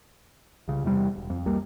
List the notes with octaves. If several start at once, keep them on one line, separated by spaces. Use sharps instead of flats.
C2 C#3
E2 C3 G3
E1
F2
C2 G3 A#3